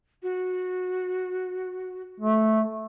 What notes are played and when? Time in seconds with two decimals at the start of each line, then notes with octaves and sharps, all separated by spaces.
0.23 F#4
2.20 A3